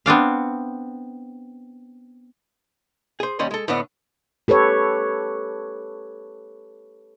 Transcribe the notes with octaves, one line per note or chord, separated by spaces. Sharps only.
B3 C4 D4 F5
G#4 C5
D#2 G3 C#4 D#5 C6
G#3 A4
A2 D3 B3 D4 D#5
G4 A4 B4 C#5